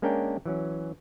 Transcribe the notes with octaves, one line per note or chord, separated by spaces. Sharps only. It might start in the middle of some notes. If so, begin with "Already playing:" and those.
G#3 A#3 C#4 D4 A#4 G5
E3 F#3 C#4